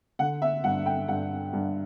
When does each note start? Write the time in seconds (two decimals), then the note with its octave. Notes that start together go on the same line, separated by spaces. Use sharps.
0.19 D3 F#5
0.42 E5
0.64 G2 F#5
0.86 G5
1.08 G2 F#5
1.53 G2